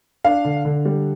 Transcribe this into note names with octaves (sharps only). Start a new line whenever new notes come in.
D4 F5
D3
D3
G3